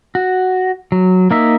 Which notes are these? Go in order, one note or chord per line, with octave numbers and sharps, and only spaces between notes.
F#4
F#3
A#3 D#4 E5